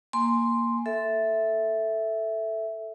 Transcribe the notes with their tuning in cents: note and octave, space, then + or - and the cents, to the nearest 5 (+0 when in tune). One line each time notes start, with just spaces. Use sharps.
A#3 +0 G#5 +0 C6 +0
A4 +0 E5 +0